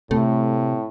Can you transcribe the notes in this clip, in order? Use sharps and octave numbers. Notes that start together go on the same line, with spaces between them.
A2 C3 A3